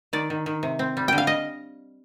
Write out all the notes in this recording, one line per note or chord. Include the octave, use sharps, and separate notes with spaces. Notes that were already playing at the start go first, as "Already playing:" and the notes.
D#3 D5
D#3
D#3
C3
C4
G3
D3 G5
F5
D#5